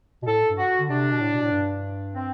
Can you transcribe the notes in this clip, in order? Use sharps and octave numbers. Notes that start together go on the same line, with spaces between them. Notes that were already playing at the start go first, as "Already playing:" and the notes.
B2
A2 A4
G2
F#4
D3
C3 D4
B2
A2
B2
A2
G2
C4